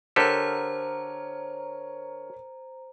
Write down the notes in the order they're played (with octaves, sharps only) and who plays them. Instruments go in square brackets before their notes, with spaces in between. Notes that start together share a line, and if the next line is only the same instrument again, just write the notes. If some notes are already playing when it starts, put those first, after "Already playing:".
[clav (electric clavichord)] D3 G4 A4 [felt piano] A#4 C#5 [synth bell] C5 A#5